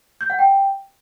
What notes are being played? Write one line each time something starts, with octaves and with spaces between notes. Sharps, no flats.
G6
F#5
G5